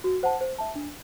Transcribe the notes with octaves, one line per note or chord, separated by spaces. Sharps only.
F#4
C5 F#5 A5
C5
E5 A5
D4